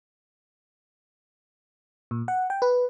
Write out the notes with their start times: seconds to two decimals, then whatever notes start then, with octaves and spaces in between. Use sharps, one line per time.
2.11 A#2
2.28 F#5
2.50 G5
2.62 B4